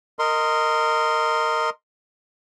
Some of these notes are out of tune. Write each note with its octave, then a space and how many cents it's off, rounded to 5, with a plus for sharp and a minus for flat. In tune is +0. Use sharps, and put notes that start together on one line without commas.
A#4 -15 D#5 +0 C6 +0